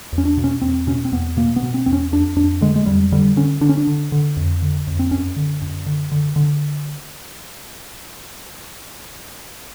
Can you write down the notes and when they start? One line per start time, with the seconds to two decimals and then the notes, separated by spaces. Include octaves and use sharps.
0.13 E2
0.18 C#4
0.25 D4
0.37 B2
0.44 C#4
0.61 E2 C4
0.87 B2 C#4
1.05 C4
1.12 E2 B3
1.37 B2 A#3
1.56 B3
1.63 B2
1.74 C4
1.86 E2 C4
1.93 C#4
2.12 F2 D4
2.36 F2 D4
2.61 D3 G#3
2.76 G#3
2.86 F2 G3
3.12 D3 G3
3.36 D3 C#4
3.61 D3 D4
3.69 C#4
3.78 D4
3.87 D3
4.12 D3
4.37 F2
4.62 D3
4.87 F2
4.99 C4
5.11 F#2 C#4
5.36 D3
5.62 F#2
5.86 D3
6.12 D3
6.36 D3